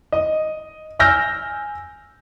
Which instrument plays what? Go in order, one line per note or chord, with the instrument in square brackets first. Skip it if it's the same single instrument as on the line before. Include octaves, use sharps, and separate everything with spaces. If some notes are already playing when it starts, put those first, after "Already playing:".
[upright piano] D#5
G#5 E6 F6 G6 A#6